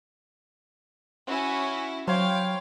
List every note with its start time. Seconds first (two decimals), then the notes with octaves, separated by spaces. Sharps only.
1.27 C#4 E4 F#4 G#5
2.08 F#3 C5 C#5 F5 G5 B5